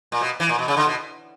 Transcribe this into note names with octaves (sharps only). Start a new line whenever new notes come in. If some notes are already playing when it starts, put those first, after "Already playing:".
A#2
B2
E3
A#2
B2
C#3
D3
B2